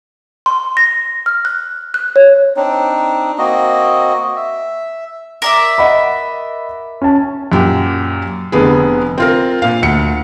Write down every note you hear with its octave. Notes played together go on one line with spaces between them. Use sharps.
C6
A#6
F6
F#6
F#6
C#5
C4 D4 D#4
A#3 C4 F#4 D#5
E5
A#4 D5 E5
D#5 F#5 B5
C#4 A5
F#2 A#2 G4
F1 D3 B3 G#4
C4 F4 A#4
A#2 F5
D2 C#7